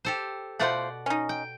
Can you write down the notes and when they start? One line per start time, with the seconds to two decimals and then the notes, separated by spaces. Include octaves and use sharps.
0.05 G4 A4 C5
0.59 B2 A3 F4 C5 D5 F#5
1.06 C#4 D#4
1.29 G5